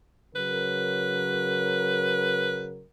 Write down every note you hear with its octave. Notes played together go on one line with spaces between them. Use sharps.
C#3 F#3 A#4 B4